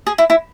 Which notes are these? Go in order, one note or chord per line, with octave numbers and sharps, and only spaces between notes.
G#4
E4
E4